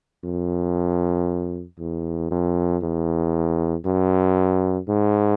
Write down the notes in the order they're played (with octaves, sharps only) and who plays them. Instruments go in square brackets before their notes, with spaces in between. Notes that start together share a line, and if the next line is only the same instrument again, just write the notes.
[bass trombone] F2
E2
F2
E2
F#2
G#2